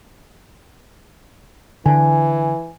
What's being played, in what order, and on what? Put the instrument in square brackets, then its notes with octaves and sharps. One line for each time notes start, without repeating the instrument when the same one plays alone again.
[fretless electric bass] D3 [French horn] E3 [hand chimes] G#5